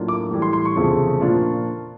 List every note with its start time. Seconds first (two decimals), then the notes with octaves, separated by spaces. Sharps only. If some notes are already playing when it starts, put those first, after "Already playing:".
Already playing: A2 F#3 A#3 D4 F4
0.08 D6
0.31 A2 E3 G3
0.42 C6
0.53 C6
0.65 C#6
0.76 F1 E2 C#3 F3 A3
1.21 A#2 F3 A#3 D4 F4